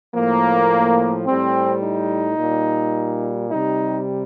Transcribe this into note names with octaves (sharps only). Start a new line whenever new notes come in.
A2 F3 A#3
A2 G3 C4
D#4
A#2 G3
C3 G3 D#4